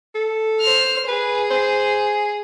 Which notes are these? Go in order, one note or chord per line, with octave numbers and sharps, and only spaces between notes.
A4
C5 F6
G#4 B4
C5